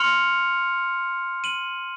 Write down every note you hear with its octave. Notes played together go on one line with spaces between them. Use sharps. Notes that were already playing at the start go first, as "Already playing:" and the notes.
Already playing: C6 F6 C#7 F7
D#7 F#7